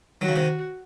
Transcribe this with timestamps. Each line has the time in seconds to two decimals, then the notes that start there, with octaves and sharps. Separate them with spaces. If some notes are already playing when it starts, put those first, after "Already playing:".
0.21 D#3 F#3 F#4
0.28 C#3
0.36 C3 D#3